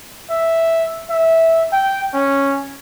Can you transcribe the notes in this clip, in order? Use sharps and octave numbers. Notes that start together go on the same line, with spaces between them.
E5
E5
G5
C#4